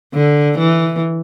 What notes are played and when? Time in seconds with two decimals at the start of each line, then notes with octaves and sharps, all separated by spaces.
0.14 D3
0.58 E3